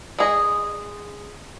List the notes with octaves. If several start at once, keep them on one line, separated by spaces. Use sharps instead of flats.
G#3 G#4 D#5